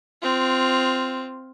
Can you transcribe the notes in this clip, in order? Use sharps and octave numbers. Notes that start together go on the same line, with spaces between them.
C4 F4